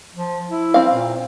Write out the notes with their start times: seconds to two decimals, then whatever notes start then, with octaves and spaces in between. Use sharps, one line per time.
0.15 F3
0.50 E4
0.74 C4 F5
0.91 A#2